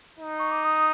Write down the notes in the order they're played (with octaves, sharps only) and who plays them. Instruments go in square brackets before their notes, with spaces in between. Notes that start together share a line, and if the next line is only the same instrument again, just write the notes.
[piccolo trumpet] D#4
[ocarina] C#6
D6
D#6